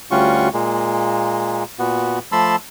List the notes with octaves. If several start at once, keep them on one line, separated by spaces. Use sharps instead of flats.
D2 G3 C#4 F4 F#4 C#6
A#2 G#3 A#3
A#2 B3 F#4
F3 A3 A5 B5 C6 E6